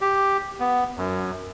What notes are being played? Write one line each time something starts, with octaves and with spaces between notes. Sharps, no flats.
G4
B3
F#2